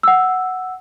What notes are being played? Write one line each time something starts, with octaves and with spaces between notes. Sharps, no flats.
F#5 E6